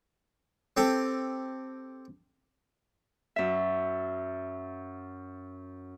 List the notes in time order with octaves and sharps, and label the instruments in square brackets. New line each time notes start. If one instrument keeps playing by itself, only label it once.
[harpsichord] C4 G4 A4
[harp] F#2 E5